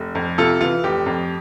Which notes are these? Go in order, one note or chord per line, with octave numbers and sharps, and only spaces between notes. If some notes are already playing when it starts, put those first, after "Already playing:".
Already playing: F1
F2
C3 F4 A4
E3 F4
F1 G4
F2